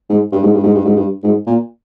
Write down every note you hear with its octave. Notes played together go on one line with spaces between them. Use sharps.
G#2
G2
G#2
G2
G#2
G2
G#2
G2
G#2
A#2